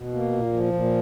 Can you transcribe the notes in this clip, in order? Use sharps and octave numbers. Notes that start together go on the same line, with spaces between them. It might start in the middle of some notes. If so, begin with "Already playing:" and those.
Already playing: B2
A#3
A#2
F3
A#2